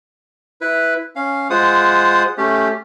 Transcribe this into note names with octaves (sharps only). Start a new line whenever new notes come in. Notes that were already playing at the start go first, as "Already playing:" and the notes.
E4 B4
C#4 F5
G#3 F4 C5 F#5 D#6
A3 C#4 G4